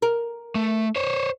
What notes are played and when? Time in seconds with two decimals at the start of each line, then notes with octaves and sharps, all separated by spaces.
0.02 A#4
0.55 A3
0.96 C5 C#5